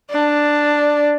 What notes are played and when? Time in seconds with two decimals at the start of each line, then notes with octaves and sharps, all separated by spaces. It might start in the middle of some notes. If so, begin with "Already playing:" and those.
0.11 D4